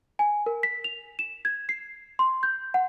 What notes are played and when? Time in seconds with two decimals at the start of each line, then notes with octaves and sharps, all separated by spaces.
0.19 G#5
0.46 A#4
0.63 B6
0.84 F7
1.19 E7
1.45 G#6
1.69 C7
2.19 C6
2.43 G6
2.74 F#5